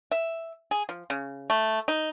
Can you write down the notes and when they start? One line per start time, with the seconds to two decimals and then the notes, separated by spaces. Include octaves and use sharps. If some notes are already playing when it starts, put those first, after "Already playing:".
0.12 E5
0.71 G#4
0.89 F3
1.10 C#3
1.50 A3
1.88 D#4